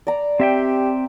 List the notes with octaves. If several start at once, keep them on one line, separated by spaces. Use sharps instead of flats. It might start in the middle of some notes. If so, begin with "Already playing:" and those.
D5 A#5
C4 G4 E5 G5